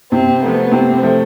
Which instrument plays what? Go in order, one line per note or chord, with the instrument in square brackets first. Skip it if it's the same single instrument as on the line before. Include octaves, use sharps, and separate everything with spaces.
[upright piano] C3 [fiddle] C4
[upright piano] F3 A3 [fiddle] B3
[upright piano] C3 [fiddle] C4
[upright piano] F3 A3